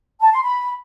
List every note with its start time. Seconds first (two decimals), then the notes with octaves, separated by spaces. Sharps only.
0.21 A5
0.32 C6
0.43 B5